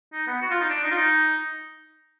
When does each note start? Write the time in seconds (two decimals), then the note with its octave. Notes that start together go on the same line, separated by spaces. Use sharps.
0.13 D#4
0.27 B3
0.42 F#4
0.51 F4
0.60 D#4
0.69 D4
0.83 D#4
0.91 F4
0.97 D#4